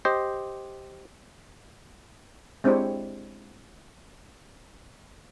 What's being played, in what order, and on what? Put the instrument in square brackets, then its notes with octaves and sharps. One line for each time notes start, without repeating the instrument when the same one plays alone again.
[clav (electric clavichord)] G4 C5 D#5
[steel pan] G#3 C4 D4 E4 G4 C#5